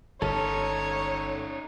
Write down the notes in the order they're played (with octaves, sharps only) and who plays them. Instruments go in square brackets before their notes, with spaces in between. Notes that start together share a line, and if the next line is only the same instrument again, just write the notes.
[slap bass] G1 [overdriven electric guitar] C#4 D#4 [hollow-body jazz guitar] A4 [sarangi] C#5